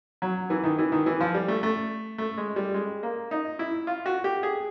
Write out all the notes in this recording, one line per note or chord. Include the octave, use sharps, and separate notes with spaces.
F#3
E3
D#3
E3
D#3
E3
F3
G3
A3
A3
A3
G#3
G3
G#3
A#3
D#4
E4
F4
F#4
G4
G#4